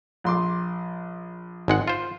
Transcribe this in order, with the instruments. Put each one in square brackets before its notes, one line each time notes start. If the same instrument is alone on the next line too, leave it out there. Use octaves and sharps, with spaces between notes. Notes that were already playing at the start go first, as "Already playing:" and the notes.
[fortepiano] A#1 C6 D6
[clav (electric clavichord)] G#1 G#3 F#5
F4 C5